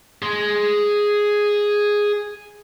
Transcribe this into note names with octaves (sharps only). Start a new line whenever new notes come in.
G#4 C6